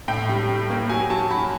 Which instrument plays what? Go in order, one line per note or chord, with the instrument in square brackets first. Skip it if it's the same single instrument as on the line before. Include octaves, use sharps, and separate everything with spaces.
[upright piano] A2 G5
G3
G3
A#3
F#3 G#5
F#3 A5
F#3 B5